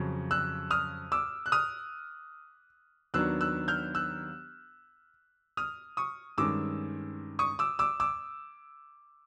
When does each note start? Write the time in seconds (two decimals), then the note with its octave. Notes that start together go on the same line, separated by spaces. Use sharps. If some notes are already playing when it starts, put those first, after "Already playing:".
Already playing: F2 C#3 F#3
0.31 E6 F#6
0.71 D#6 F6
1.12 D6 E6
1.46 F#6
1.52 D#6 F6
3.14 D#2 D#3 F#3 B3 D4 E6 F#6
3.41 E6 F#6
3.68 F6 G6
3.95 E6 F#6
5.57 D#6 F6
5.97 C#6 D#6
6.38 G2 D#3 G#3 C#4 D6 E6
7.39 C#6 D#6
7.59 D6 E6
7.79 D6 E6
8.00 D6 E6